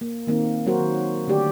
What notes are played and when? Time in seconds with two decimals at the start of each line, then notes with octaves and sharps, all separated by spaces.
0.01 A#3
0.27 D#3 A#3 C4 D#4
0.66 F#3 A#3 F#4 A#4 C5
0.80 D#3
1.28 D3 A3 G4 D5